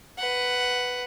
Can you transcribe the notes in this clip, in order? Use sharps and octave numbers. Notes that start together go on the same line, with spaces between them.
B4 F#5